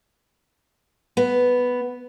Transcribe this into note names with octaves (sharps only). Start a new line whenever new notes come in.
B3